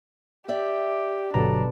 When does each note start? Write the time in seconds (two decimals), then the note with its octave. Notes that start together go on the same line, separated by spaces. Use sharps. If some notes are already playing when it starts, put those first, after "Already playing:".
0.48 G4 D5 E5 G5
1.34 G1 B2 F#3 D4 A4 A#5